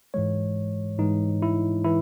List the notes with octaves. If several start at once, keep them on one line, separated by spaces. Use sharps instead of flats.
G#2 E3 G#3 C#5
G#2 E3 G#3 D#4
E4
E3 E4